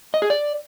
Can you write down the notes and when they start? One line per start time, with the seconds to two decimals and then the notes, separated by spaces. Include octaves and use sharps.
0.14 D#5
0.22 G#4
0.30 D5